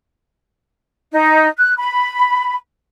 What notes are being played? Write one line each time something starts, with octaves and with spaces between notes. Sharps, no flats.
D#4
F#6
B5